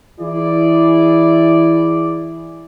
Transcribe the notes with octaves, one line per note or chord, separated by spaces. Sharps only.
E3 E4 G#4 D5